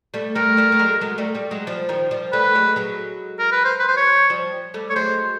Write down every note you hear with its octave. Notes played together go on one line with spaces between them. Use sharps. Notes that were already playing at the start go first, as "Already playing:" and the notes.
G3 A3
G3 A3 A#4
G3 A3
A3
F#3 G#3
F#3 G#3
G3 A3
G3 A3
F#3 G#3
F3 G3
D#3 F3
F3 G3
G3 A3 B4
F#3 G#3
F#3 G#3
A#4
B4
C5
B4
C5
C#5
F3 G3
G3 A3
C#5
F#3 G#3 C5